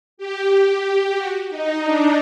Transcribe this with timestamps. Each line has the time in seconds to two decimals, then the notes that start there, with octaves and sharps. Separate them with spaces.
0.17 G4
1.16 F#4
1.49 D#4
1.83 D4